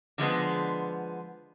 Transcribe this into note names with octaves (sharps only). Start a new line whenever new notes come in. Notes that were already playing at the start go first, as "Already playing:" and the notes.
D3 F3 G#3 B3